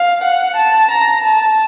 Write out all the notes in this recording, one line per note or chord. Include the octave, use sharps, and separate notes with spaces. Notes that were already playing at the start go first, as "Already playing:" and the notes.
Already playing: F5
F#5
A5
A#5
A5